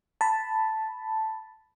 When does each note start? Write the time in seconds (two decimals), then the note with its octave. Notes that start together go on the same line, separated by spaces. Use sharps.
0.21 A5 B5